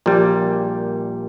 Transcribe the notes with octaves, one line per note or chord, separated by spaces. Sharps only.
A#1 A#2 G3